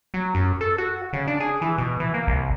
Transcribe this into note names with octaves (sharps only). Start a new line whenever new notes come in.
F#3
F#2
A4
F#4
C#3
D4
G#4
E3
B2
E3
A#3
C2